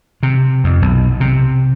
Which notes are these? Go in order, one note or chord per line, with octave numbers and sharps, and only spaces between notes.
C3
F2
B1
C3